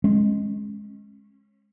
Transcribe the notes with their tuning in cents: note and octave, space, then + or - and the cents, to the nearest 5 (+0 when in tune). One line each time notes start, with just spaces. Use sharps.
G#3 +0 C#4 -30